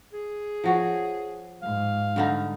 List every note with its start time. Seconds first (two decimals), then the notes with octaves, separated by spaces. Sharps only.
0.13 G#4
0.64 F3 F#4 C#5
1.62 G#2 F5
2.16 G2 D3 D#4